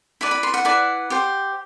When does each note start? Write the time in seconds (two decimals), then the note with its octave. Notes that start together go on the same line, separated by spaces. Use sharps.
0.21 E4 B4 D5
0.31 B5
0.43 C6
0.54 F#5
0.65 E4 B4 D5
1.10 G4 C5